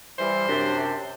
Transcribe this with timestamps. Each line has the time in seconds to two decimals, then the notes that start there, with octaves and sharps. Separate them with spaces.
0.18 E3 G3 C5
0.48 F#2 C3 D4